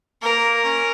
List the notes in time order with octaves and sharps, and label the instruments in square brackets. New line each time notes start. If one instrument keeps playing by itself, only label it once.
[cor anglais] A#3 [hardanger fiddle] A#4
[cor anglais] C#4